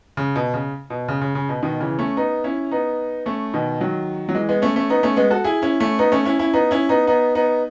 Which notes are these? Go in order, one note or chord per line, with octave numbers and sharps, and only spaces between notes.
C#3
B2
C#3
B2
C#3
C#3
C#3
B2
B2 D#3
C#3 E3
A3 C#4
B3 D#4
C#4 E4
B3 D#4
A3 C#4
B2 D#3
D#3 F#3
F#3
E3 G#3
G#3 B3
A3 C#4
A3 C#4
B3 D#4
A3 C#4
G#3 B3
F#4 A4
E4 G#4
C#4 E4
A3 C#4
B3 D#4
A3 C#4
C#4 E4
C#4 E4
B3 D#4
C#4 E4
B3 D#4
B3 D#4
B3 D#4